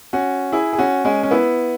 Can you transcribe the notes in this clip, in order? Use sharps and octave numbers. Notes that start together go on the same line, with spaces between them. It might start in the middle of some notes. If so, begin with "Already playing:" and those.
C#4 F#4
E4 G#4
G#4
C#4 F#4
G#3 C#4
C#4
B3 E4